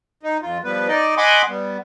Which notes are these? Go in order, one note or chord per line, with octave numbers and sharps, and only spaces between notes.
D#4
F2 F4
F3 G3 B3 B4
D#4 D5 D#5
D#5 F#5 G#5 B5 C6 D6
G3 B3